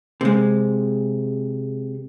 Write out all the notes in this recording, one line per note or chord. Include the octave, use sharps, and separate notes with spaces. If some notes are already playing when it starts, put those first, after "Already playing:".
C3 G#3